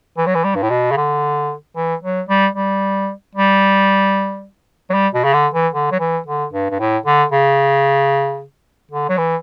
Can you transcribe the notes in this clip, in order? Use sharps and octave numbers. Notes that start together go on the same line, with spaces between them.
E3
F#3
E3
G3
G2
A2
B2
C#3
D3
E3
F#3
G3
G3
G3
F#3
G3
B2
C#3
D3
E3
D3
F#3
E3
D3
G2
G2
A2
D3
C#3
D3
F#3
E3